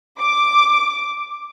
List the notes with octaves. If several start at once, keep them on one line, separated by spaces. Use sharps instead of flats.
D6